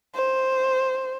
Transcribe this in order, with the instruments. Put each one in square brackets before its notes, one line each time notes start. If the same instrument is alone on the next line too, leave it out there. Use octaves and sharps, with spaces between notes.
[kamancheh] C5